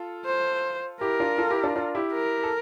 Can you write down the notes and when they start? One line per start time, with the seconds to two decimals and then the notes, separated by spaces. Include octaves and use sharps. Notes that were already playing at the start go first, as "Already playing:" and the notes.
Already playing: F4 A4
0.26 C5
1.01 E4 G4 A#4
1.20 D4 F4
1.38 F4 A4
1.51 E4 G4
1.64 D4 F4
1.76 D4 F4
1.95 E4 G4
2.13 A#4
2.43 A4